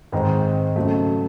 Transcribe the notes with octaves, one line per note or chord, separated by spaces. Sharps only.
G#2 D#3 G#3 C4
C#3 F#3 A3